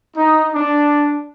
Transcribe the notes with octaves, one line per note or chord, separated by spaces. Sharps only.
D#4
D4